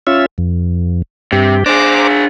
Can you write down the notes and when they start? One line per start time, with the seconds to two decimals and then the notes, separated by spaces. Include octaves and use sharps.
0.07 C#4 F4 E5
0.38 F2
1.32 G2 C3 G4
1.66 D4 G#4 C5 A#5 D6